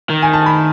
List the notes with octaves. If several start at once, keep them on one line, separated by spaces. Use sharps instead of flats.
D#3
G#5
A5
B5